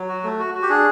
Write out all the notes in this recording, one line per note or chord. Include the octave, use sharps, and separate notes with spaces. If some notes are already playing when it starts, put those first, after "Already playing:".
Already playing: F#3
F#4
A3
F#4
F#4
G4
D4 G#4